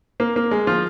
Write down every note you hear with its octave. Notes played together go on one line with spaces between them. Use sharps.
A#3
A#3
G#3
F3 F4